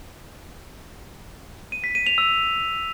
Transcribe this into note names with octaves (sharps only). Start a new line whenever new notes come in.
D#7
B6
D#7
F7
E6